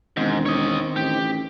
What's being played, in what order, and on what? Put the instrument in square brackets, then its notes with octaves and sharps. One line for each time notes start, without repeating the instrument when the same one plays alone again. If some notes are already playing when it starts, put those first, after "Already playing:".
[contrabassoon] E1 [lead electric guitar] G#2 [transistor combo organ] D#3 C4
[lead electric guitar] C#5 D#5
[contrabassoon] A1 [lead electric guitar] G4